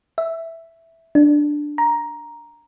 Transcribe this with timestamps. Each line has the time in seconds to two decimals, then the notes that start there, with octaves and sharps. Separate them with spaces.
0.18 E5
1.15 D4
1.78 A#5